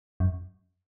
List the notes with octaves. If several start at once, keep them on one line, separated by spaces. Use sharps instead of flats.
F#2